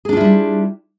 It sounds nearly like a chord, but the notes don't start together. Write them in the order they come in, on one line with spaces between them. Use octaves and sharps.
G#4 D4 F4 E4 G3